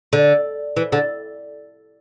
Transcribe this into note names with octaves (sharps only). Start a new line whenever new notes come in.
D3
E3
D3